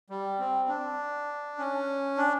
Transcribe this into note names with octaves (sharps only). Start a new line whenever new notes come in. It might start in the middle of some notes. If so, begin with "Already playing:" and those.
G3
C4
D4
C#4
D4